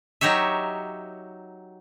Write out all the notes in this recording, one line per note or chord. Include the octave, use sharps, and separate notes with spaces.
F#3 D#4 G4 C#5 E5